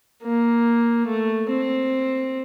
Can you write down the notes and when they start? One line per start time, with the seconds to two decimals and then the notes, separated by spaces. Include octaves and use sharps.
0.23 A#3
1.07 A3
1.49 C4